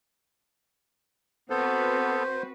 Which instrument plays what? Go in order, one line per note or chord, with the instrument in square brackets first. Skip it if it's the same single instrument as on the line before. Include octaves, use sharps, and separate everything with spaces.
[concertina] B3 A4 [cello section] C4 F#4 B4 [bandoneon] C5